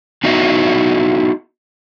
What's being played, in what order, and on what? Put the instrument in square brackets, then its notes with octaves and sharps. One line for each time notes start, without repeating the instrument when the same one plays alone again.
[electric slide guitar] B3 D#4 E4 F#4 D#5